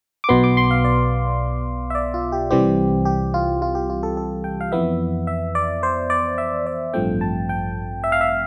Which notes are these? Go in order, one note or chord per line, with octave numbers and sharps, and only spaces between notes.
D6
B1 B2 B3 C6
D6
C6
F5
D5
E5
D5
F4
G4
C2 C3 E3 G3 C4 G4
G4
F4
F4
G4
F4
A4
A4
G5
F5
F2 E3 B3 E5
E5
D5
C5
D5
E5
D5
A1 G2 F3 A3 C4 G5
A5
G5
E5
F5
E5